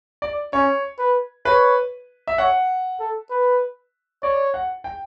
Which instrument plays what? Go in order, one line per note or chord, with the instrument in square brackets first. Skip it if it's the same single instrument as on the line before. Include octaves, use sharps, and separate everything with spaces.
[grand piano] D5
[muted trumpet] C#4 [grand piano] C#5
[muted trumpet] B4
[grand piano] B4 [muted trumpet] C#5
[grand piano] E5
[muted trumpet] C#5 [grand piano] F#5
[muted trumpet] A4
B4
[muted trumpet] C#5 [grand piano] D5
[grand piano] F#5
G5